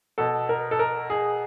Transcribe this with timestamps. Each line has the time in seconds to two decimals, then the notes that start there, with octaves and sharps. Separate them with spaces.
0.18 B2 A4
0.49 A#4
0.71 A4
0.79 A#4
1.10 G#4